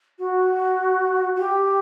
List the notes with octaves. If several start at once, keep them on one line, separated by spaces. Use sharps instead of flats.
F#4
F#4
G4